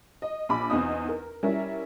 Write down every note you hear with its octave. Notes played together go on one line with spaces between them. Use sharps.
D#5
A#1 B5 D6
E2 C4 D#4 D#6
A#4
G3 C#4 E4 A#4 E5